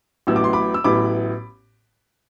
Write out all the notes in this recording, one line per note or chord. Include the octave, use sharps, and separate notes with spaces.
A1 A2 F#3 B3 E4 E6
D6
C6
B5 D6
E6
A1 A2 F#3 B3 E4 B5 D6